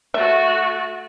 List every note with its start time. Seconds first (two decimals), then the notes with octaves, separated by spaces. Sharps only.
0.14 A3 F#4 E5